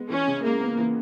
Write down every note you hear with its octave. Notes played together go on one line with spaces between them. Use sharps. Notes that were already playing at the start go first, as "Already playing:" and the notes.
Already playing: G#3 B3
E3 C#4
C#3
G#3 A#3
B3
E3